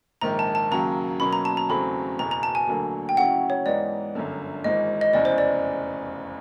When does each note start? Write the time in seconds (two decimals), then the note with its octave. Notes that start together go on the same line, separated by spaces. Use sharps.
0.21 A#1 G#2 D#3 A#5
0.39 A5
0.55 A5
0.71 D#2 C#3 F#3 A#5
1.20 B2 F#3 A#3 C#4 B5
1.33 A#5
1.45 A5
1.57 A#5
1.69 E2 C#3 F#3 A3 C4 B5
2.19 F#1 E2 B2 A#5
2.31 A#5
2.43 A5
2.55 G#5
2.68 D2 D3 F#3 A#3
3.09 G5
3.17 C#3 F#3 A3 C#4 E4 F#5
3.50 C#5
3.66 G#2 E3 G#3 B3 D#4 D5
4.15 G1 F#2 D3
4.64 G#1 G#2 E3 G#3 D#5
5.01 D#5
5.13 F1 E2 C#3 E3 D5
5.25 C5
5.38 D5